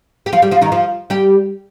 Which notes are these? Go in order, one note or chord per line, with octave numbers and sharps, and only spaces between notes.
G4
F3 F4
G3 G4
F3 F4
D#3 D#4
F3 F4
G3 G4